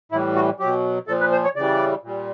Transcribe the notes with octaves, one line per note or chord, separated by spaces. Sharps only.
A2 E3 G3 E4
F#4
B2 F#3 G4
A#2 F3 A4
B4
C5
C#5
C#3 E3 G3 D5
A#2 G3